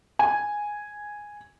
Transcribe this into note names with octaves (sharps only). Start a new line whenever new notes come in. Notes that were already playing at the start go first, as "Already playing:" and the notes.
G#5